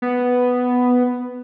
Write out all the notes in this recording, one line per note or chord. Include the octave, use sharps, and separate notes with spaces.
B3